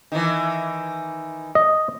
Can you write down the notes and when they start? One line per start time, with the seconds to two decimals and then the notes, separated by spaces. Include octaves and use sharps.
0.12 D#3 E3
1.55 D#5